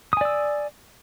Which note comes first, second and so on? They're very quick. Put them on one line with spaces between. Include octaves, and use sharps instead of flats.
D#6 G#5 D5 E6